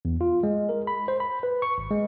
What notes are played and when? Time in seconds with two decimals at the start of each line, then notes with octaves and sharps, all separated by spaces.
0.05 E2
0.21 F4
0.43 G#3
0.69 A#4
0.87 B5
1.08 C5
1.20 B5
1.43 B4
1.62 C#6
1.78 G#1
1.91 G#3